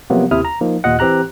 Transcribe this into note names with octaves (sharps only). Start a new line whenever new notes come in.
C3 F3 F#3 A#3 B3
D#2 C3 E4 D#6 F6
A#5
F3 A#3 D#4
D#2 A#2 F4 D#5 F#5
E3 C4 G4 A#5 F#6